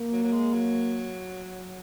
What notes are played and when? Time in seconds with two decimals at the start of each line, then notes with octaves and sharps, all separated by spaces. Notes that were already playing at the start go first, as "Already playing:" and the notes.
Already playing: A#3
0.12 F#3
0.24 F#3
0.32 G#3
0.53 F#3